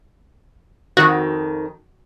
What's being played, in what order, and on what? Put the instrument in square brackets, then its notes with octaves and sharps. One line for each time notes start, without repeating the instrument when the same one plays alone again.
[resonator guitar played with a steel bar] F2 D#3 [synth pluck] F#4